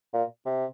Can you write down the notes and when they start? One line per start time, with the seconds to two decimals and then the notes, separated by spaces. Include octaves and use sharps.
0.13 A#2
0.45 C3